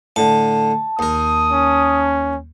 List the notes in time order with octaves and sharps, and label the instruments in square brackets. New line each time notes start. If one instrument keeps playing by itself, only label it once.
[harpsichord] A2 D3 [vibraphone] A5
[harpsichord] D#2 A#4 [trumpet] D#6
[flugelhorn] C#4